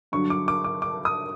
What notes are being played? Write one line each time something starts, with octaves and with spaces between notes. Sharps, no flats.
G2 D3 F#3 C#6
D6
D6
D6
D6
D#6